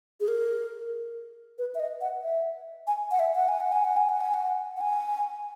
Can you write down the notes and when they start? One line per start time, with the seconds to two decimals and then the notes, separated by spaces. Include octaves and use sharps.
0.20 G#4
0.28 A#4
1.58 B4
1.75 E5
1.79 D#5
2.01 F#5
2.22 E5
2.87 G#5
3.11 F#5
3.19 E5
3.35 F#5
3.48 G#5
3.60 F#5
3.72 G#5
3.84 F#5
3.97 G#5
4.09 F#5
4.20 G#5
4.34 F#5
4.76 F#5
4.81 G#5